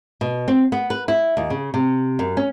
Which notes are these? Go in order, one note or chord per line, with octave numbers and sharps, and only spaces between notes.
B2
C4
B3
B4
E4
D#2
C#3
C3
F#2
C#4